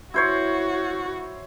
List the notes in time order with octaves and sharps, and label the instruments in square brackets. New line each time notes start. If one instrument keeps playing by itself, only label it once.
[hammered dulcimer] E4 C5 C#5 [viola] F#4